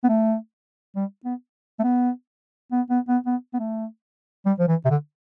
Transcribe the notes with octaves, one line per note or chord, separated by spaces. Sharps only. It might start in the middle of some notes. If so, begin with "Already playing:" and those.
B3
A3
G3
B3
A3
B3
B3
B3
B3
B3
B3
A3
G3
F3
E3
C3
D3